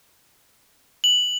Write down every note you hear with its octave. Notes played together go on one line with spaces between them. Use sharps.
F#7